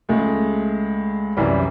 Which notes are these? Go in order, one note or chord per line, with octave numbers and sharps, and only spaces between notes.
C#2 G#3 A3
C2 F#2 E3 G3